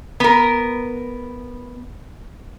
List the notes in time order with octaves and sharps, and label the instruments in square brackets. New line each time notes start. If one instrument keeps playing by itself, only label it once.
[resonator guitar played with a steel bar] B3 A#4